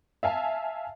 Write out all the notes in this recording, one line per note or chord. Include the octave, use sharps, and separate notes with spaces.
E5 F5 G#5 A5